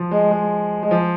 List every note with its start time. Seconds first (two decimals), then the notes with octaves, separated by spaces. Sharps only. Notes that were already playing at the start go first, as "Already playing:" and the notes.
Already playing: F3
0.11 G#3
0.31 G#3
0.83 G#3
0.91 F3